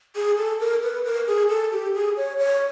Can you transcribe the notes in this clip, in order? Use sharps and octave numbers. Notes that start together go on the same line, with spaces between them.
G#4
A4
A#4
B4
A#4
G#4
A4
G4
G#4
C#5
C#5